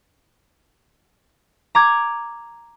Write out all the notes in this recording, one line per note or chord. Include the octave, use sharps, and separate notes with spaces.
A#5 D6 G#6